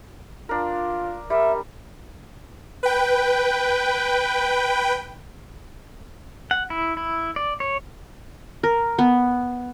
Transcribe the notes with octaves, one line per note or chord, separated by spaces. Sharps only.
D4 F4 A#4
G3 A#4 E5
B4 G5
F#5
E4
E4
D5
C#5
A#4
B3